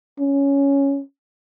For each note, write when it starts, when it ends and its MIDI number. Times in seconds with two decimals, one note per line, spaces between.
0.19 1.00 61